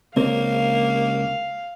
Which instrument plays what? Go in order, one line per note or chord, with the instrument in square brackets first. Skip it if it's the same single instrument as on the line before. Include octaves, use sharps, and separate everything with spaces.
[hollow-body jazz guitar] C#2 C4 [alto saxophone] A#3 [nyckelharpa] F5